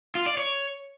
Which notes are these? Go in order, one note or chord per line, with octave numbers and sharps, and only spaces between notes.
F4
D5
C#5